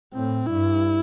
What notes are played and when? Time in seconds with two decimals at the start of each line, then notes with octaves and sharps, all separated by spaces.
0.14 A2 C4
0.46 G2 E4